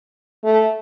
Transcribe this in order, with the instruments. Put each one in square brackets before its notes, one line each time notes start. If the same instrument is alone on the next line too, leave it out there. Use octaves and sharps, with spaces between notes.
[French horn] A3